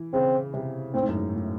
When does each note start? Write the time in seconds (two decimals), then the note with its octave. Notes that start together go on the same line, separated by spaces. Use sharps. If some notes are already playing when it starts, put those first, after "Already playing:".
Already playing: E3
0.13 C#3 C4
0.54 C3
0.94 A2 C4
1.02 G#2
1.09 F#2
1.15 G#2
1.34 A2